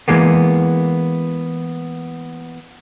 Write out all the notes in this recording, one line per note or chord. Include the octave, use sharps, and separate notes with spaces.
E3 G#3 A#3 B3